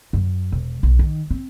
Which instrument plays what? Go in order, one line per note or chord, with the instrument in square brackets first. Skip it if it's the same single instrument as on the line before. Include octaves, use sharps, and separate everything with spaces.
[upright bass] F#2
E1
B1
D#3
C4